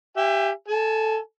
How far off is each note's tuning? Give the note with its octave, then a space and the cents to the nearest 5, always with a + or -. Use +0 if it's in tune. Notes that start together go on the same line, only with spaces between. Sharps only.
G4 +0 E5 +25 G#5 -30
A4 +0 G#5 +25